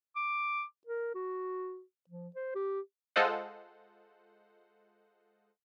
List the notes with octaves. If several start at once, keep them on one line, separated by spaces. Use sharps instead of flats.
D6
A#4
F#4
F3
C5
G4
G#3 F4 A4 C5 D#5 F#5